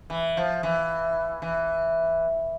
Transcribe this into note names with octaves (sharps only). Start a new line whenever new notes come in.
E3
F3
E3
E3